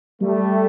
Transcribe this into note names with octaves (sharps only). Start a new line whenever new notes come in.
G3 A3